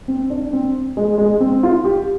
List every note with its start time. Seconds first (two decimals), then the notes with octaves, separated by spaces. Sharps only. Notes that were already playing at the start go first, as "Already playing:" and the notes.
0.08 C4
0.30 D4
0.53 C4
0.97 G#3
1.18 G#3
1.40 C4
1.63 F4
1.85 G4